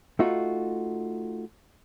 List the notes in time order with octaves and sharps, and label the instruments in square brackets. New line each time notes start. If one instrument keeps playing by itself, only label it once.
[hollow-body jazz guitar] A3 D#4 F4 F#4